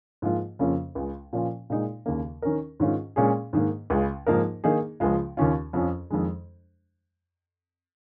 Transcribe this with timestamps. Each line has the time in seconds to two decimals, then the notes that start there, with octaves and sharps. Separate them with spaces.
0.22 G#2 F3 A#3 F4
0.59 F2 C#3 A#3 C#4 F4
0.95 C#2 C#3 G#3
1.33 A#2 F3 C#4 F4
1.70 A#2 G#3 D#4
2.06 D#2 C#3 A#3
2.42 D#3 C#4 A#4
2.80 G#2 D#3 C#4 F4
3.16 A#2 G#3 C#4 G#4
3.53 G#2 D#3 A#3
3.90 C#2 C#3 G#3
4.27 G#2 F3 A#3 D#4 A#4
4.64 D#3 A#3 D#4 G#4
5.00 C#2 C#3 F3 G#3 F4
5.37 D#2 D#3 C#4 F4
5.73 F2 F3 C#4
6.10 F2 D#3 G#3